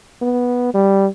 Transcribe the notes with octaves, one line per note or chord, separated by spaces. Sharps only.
B3
G3